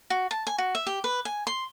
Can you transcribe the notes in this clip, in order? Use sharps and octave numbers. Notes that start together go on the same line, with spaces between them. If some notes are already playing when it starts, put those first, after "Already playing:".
F#4
A5
G#5
F#4
E5
G4
B4
G#5
C6